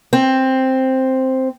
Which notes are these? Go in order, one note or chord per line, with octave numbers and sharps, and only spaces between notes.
C4